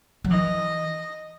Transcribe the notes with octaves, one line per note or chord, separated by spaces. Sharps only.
F#3
E3 D#5